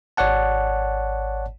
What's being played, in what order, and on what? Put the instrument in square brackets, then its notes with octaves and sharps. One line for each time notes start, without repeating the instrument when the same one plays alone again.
[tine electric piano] G#1 C#5 D5 F#5 A5